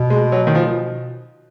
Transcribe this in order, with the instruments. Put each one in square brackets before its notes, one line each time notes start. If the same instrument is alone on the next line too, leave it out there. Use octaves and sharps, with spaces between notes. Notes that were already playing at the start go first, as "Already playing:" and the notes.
Already playing: [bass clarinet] B2
[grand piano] G#3
F#3
D#3
F3